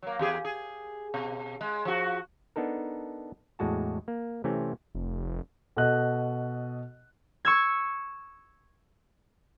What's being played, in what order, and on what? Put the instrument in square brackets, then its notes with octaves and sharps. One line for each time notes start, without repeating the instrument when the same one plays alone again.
[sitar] F#3 A#3
E2 G4 G#4
G#4
B2
G#3
F3 F#4
[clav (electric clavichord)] B3 D4 D#4 A4 A#4
E2 A2 G#3 F#4 A5
A#3
C3 E3 A3 C4 C#4
[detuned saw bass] F1
[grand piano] B2 A4 D#5 F#6
[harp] C#6 E6 G#6